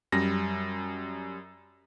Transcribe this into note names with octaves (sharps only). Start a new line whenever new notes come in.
F#2 G3 A#6